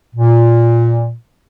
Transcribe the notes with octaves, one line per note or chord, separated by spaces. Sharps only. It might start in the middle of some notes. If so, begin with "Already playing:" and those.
A#2